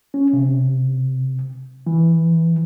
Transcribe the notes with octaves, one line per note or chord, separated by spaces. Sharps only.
C#4
C3
E3